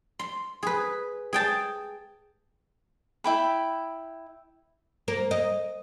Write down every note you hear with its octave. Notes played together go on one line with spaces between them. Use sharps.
C6
G#4 B4
G#4 G5 A5
E4 G5 B5
A#3
D#5